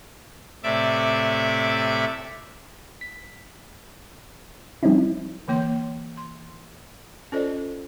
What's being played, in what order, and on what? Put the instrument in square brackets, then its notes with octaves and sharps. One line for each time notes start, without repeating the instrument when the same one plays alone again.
[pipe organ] A2 C3 D5 E5 D6
[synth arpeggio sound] B6
F3 G3 C4 C#4 D#4 E4
[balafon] D3 E3 A#3 C#5 C6
C6
C#4 F4 A4 C5 D5 D#5